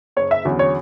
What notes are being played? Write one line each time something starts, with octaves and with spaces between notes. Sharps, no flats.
F#1 C#5
E5
E2 D3 F#3 C#4
C#5